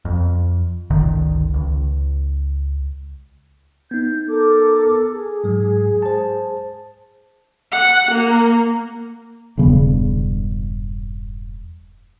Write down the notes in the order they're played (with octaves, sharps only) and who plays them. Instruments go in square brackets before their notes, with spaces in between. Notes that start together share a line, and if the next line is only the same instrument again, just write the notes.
[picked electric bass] F2
G1 C#2 D3 D#3
C#2
[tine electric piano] B3 D#4 [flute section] G6
[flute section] A4 A#4 D6
G#4
[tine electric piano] G#2 F#3 G#3
C5 A5
[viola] F#5
A#3
[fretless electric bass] E1 G2 C#3 B3